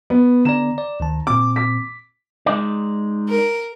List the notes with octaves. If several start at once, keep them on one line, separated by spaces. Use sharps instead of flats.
B3
D3 B3 D5 A#5 E7
D5
D2 D#3 A5
A#2 C4 D6
D6 B6
G#3 D#4 D5
A#4